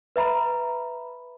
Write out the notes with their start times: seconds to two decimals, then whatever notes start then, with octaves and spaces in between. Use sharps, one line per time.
0.16 B4 E5 A#5 B5